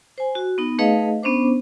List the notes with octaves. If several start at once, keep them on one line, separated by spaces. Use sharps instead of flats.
C5 G#5
F#4
B3 D#4
A3 D#4 G#4 B4 D#5 F5
B3 C#4 D4 C5 D6